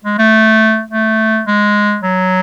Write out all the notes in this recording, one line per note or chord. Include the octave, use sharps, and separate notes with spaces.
G#3
A3
A3
G#3
F#3